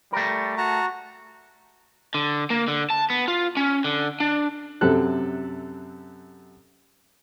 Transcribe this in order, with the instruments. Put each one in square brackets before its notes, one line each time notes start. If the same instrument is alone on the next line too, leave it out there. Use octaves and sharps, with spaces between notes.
[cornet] G3 [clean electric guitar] A3 A#4
[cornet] F#4 [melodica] A5 A#5
[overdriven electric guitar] D3
A#3
D3
A5
B3
F4
C#4
D3
D4
[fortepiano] F#2 C3 A4 F#6